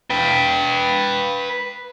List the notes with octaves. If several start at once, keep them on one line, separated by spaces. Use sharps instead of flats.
B4 G5